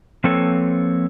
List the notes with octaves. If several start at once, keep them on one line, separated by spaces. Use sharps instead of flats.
F3 A#3 C4 A4 B4 C#5